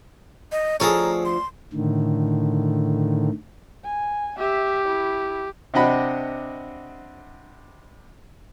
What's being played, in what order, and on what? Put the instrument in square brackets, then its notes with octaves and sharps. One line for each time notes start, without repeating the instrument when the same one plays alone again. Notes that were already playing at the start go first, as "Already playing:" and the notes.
[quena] D#5
[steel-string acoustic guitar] D2 F3 C4 [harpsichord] G#4 A4 C#5 [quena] A#5
[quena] C6
[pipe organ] A2 D3 D#3
[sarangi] G#5
[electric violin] G4 [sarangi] E5
[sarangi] E4
[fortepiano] C3 C4 D4 D#5 F#5 B5